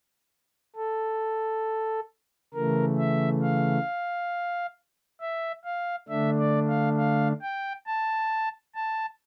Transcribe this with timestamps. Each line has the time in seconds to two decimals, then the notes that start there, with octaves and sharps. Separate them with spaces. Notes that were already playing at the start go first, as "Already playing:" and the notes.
0.76 A4
2.54 C#3 E3 A3 A#4
2.98 E5
3.42 F5
5.21 E5
5.65 F5
6.09 D3 A3 D4 E5
6.38 D5
6.68 F5
6.97 F5
7.42 G5
7.87 A5
8.75 A5